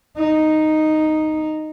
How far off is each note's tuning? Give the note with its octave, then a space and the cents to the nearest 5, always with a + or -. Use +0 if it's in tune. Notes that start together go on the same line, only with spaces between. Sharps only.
D#4 -5